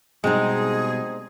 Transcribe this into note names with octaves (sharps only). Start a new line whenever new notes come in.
B2 G3 G#3 C4 D#4 G#4